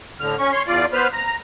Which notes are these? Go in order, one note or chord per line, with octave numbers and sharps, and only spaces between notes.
A2 D3 F6
C#4 C#6
C#5 C6
E2 F4 D5
B3 B4 C5 F6
A#5